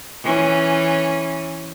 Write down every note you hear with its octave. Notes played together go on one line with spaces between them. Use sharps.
E3 C#4